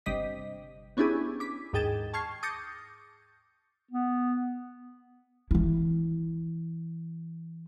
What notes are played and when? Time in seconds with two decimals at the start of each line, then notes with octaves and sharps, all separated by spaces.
0.06 G1 C3 G3 D#5 B6
0.97 B3 C#4 D4 E4 G4 G#4
1.40 D6 B6
1.73 D#2 G#2 G#4 G5 A6 E7
2.13 A5 C#6 F6 G#6 C7
2.43 D6 D#6 G6 A6 A#6 C#7
3.91 B3
5.51 E3 E4